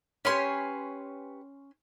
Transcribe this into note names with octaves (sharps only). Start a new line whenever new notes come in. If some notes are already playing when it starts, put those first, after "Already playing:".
C#4 G4 B4 C#5 G#5 C6